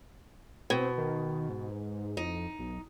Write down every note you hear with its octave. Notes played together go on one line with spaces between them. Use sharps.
B2 C4
D#3
G#2
F2 D#4
B1